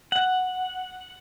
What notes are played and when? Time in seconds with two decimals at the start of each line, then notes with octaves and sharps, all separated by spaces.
0.12 F#5